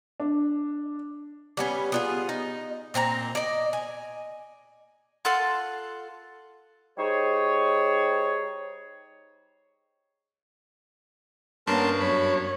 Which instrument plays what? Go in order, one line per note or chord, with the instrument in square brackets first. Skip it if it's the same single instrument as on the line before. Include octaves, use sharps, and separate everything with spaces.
[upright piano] D4
[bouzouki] G3 B3 C#4
B3 F4 G#4
D#4
A#2 C4 G4 A#5
D5 D#5
G#5
[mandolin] F4 A4 F#5 C6
[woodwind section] G3 D#4 G#4 C5 C#5
[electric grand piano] G2 [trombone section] A#3 B3 C#4 [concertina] A#4 A5 C6
[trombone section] F#2 [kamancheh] C#5 [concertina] B5